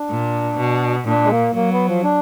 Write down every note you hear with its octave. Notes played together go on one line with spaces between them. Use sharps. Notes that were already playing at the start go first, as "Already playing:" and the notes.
Already playing: D4
A#2
B2
A#2 D4
G#3
A#3
F#3 A#3
B3
F3
D4